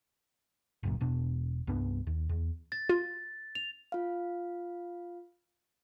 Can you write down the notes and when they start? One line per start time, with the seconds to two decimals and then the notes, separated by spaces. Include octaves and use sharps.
0.83 G1 C#2 F#2 A#2
1.01 E1 B2 D4
1.67 C2 G2 B3 D4
2.07 D#2
2.29 E2
2.72 A6
2.89 F4
3.55 F7
3.92 F4 F5